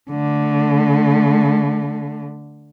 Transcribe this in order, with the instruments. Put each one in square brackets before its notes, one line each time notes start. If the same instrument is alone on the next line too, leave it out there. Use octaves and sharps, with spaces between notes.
[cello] D3 A3